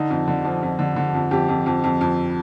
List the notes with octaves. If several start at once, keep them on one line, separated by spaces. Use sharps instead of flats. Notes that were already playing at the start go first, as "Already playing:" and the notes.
Already playing: D3 D#4
F2
D3
F3
F2
D3
D3
F2
F2 G4
F2
F2
F2
F2